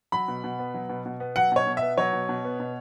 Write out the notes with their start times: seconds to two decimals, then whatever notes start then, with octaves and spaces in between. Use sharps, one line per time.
0.12 F#3 B5
0.28 B2
0.44 B2
0.59 B3
0.74 F#3
0.89 B2
1.06 B2
1.20 B3
1.36 F#3 F#5
1.52 B2 C#5
1.66 B2
1.77 E5
1.82 B3
1.98 F#3 C#5
2.13 B2
2.29 B2
2.44 B3
2.60 B2